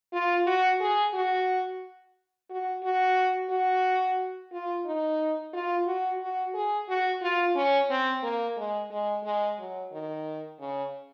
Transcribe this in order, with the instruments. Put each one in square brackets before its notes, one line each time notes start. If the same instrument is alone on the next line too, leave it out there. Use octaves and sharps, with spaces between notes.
[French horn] F4
F#4
G#4
F#4
F#4
F#4
F#4
F4
D#4
F4
F#4
F#4
G#4
F#4
F4
C#4
C4
A#3
G#3
G#3
G#3
F#3
D#3
C#3